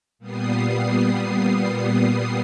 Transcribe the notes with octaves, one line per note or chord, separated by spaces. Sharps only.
A#2 G3 B3 D#6 C7